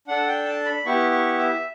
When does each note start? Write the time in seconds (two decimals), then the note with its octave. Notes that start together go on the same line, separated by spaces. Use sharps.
0.08 D4 A4 F#5
0.28 G5
0.46 A5
0.66 B5
0.86 B3 E4 G4 C#6
1.11 C#6
1.38 E5